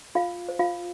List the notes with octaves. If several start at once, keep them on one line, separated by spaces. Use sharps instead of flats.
F4 F5
C5
F4 F5